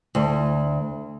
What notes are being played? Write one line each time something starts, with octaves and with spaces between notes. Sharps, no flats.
D2